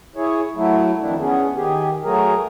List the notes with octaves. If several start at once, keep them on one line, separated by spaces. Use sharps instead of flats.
E4 G#4 C#5
F#3 A3 E4
F2 D#3 D4 E4
B3 C#4 G#4
D#3 G4 G#4
F#3 A3 G#4 A#4